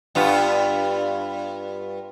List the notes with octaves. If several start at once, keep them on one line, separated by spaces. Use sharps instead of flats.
G2 B3 F4